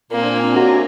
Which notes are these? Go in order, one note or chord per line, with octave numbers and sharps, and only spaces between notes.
A#2 A#3 C4 D4 G#5
F#2 C3 F#4 A#5